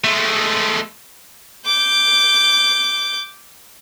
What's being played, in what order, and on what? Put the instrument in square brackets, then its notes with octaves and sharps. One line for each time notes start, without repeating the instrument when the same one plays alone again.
[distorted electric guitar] G#3 A3
[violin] D6 G6